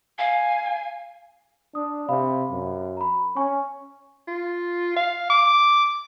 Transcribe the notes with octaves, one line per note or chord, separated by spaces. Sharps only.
F5 G#5
D4 D#6
C3 F5 B5
F#2
A#5 B5
C#4 G#5 C#6
F4
F5
D6